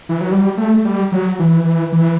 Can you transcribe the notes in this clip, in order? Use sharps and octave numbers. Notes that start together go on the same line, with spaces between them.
E3
F#3
G3
A3
G3
F#3
E3
E3
E3